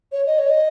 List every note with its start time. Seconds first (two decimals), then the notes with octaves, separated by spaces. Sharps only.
0.12 C#5
0.26 D#5
0.39 C#5
0.50 D#5